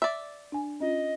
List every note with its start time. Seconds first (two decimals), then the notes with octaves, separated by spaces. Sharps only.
0.02 D5 E5
0.52 D4 G#5
0.80 C#4 F4 D#5